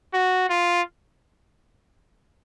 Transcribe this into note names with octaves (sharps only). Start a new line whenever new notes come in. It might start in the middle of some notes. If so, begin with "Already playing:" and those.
F#4
F4